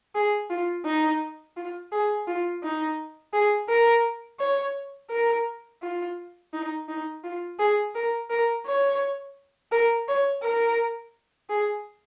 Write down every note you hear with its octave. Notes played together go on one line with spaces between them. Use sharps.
G#4
F4
D#4
F4
G#4
F4
D#4
G#4
A#4
C#5
A#4
F4
D#4
D#4
F4
G#4
A#4
A#4
C#5
A#4
C#5
A#4
G#4